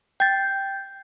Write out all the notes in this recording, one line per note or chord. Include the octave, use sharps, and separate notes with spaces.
G5 G6 A6